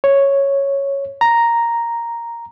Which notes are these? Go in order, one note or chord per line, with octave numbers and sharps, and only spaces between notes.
C#5
A#5